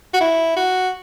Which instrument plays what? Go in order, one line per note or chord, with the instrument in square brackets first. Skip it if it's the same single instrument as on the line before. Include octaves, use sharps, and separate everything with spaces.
[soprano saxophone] F#4
E4
F#4